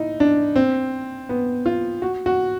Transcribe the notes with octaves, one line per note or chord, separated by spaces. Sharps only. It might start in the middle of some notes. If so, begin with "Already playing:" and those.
Already playing: D#4 E4
D4
C4
B3
F4
F#4
F#4